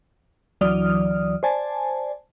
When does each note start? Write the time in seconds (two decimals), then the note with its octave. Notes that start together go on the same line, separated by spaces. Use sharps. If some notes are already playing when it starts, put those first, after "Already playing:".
0.61 D2 E3 F#3 D5 D#6 F6
1.43 C5 D5 G#5 A5